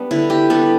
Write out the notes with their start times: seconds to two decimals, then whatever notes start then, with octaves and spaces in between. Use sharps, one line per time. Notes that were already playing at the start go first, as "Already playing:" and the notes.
Already playing: G3 B3 D4
0.11 D3 E4
0.30 G4
0.50 G3 B3 A4